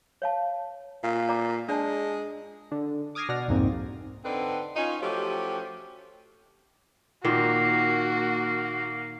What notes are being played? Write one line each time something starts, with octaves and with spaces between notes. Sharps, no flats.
C#5 F5 A5
A#2 F5
D5 A#5 D6
G#3 D4 D5 A5
D3
D6 D#6 F6 G#6 A#6 C7
B2 D5 F#5 F6 A#6
C2 F2 G#2 A#3 C4
D3 C4 D4 D#4 A4 B4
C#4 D#4 F4
F3 F#3 A3 C#4 G4
A#2 D#3 A#3 F#4